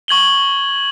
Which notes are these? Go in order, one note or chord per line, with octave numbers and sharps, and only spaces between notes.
C#6 G#6 F#7 G7